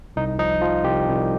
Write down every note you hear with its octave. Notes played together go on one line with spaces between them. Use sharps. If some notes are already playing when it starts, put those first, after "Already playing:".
C2 D#4
F3 D#4
F3 F4
C2 G4
C2